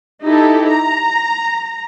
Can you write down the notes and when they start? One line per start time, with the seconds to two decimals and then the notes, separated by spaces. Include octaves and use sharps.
0.23 D#4 E4 G4 A4
0.67 A#5